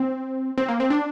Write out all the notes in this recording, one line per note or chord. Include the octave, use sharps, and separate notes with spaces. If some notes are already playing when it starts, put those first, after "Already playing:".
Already playing: C4
C4
A#3
C4
D4